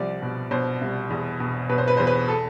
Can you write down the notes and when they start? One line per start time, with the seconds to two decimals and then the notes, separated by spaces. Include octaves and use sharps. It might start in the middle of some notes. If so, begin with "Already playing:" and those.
Already playing: C2 F3 D5
0.22 B2
0.51 B2 C5
0.81 C2
1.10 E2
1.40 B2
1.69 B2 B4
1.78 C5
1.88 B4
1.97 E2 C5
2.07 B4
2.28 A4